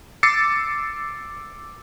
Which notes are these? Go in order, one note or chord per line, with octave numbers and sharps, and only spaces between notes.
D6 E6 A6 C7 C#7